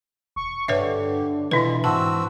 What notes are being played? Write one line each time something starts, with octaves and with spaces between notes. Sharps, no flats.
E1 C#6
G2 D3 G4 B4 C#5 E5
B2 E3 G#3 D4 E4 F4 B4
G#2 C4 F#4 A5 E6